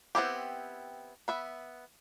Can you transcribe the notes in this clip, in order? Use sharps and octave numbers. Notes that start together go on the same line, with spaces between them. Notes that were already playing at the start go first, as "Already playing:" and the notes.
B3 C4 E4 G4
B3 E5 B5